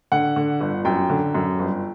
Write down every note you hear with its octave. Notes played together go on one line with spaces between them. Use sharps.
D3 F#5
D3
G1
F#2 G5
D3
F#2
G1